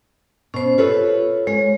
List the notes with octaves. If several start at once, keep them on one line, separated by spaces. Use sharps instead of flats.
B2 C#4 C5
F4 A4 B4 C#5
G#3 C#5